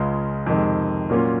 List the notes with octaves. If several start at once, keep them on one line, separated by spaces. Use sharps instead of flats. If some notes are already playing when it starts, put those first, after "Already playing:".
Already playing: C#2 C#3 G#3 C#4 F4
F2 C3 D#3 G#3
A#2 F#3 A#3 C#4 F4